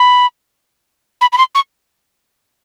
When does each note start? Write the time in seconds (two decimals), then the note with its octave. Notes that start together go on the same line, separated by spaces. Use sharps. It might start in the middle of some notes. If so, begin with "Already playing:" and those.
Already playing: B5
1.21 B5
1.32 B5
1.38 C6
1.55 C#6